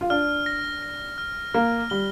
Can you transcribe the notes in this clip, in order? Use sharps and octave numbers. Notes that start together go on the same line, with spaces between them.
F4
D4 F6
A#6
A#6
F6
A#3 F6
G3 G7